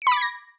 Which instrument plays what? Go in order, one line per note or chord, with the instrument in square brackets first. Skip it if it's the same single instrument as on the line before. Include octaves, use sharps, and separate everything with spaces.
[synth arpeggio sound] C#7
B5
D6
G#6
A#6